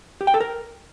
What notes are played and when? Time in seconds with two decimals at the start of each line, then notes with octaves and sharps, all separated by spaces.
0.21 G4
0.27 G5
0.34 A4
0.40 A#4